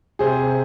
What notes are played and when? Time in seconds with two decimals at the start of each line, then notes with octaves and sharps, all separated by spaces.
0.19 C3 G#4 C5